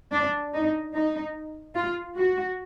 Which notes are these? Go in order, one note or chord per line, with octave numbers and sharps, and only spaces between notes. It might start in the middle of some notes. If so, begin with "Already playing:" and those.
D4
D#4
D#4
F4
F#4